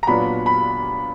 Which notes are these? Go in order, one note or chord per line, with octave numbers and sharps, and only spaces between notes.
A#5
A#2 F#3 B3 D4 F4 B5
B5